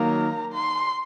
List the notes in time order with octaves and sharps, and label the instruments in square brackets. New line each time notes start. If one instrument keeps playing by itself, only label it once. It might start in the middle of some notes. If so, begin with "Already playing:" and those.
Already playing: [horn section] D#3 F#3 A#3 [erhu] A#5
[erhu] C6